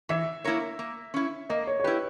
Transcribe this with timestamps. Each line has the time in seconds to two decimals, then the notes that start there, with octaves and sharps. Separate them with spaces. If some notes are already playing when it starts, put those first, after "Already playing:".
0.09 E3 E5
0.44 A#3 E4 A#4 C#5
0.79 A#3
1.14 C#4 E4
1.49 A#3 D#5
1.67 C#5
1.80 C#5
1.84 E4 G4 B4